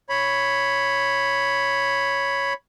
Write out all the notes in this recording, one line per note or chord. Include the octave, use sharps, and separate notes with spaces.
C#5 B5